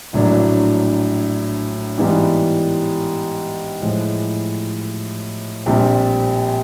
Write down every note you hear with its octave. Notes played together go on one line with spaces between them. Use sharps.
A#1 A2 F#3 A#3 D4
G#2 E3 G3 B3
A2 F3 G#3
A#1 A#2 G3 C4